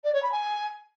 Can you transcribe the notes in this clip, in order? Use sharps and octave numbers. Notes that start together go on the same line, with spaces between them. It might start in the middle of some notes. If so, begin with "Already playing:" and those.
D5
C#5
B5
G#5